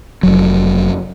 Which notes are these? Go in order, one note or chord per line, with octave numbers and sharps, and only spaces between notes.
F1 F#3